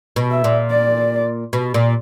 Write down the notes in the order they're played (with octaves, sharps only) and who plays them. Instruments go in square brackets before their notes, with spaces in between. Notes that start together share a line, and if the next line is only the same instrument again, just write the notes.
[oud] B2
[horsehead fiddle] E5
[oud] A#2
[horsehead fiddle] D5
[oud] B2
A#2